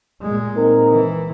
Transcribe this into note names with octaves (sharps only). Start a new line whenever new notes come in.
A#2 G#3
C4 D#4 A#4
E3